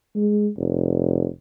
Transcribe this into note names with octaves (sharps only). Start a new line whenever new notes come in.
G#3
F1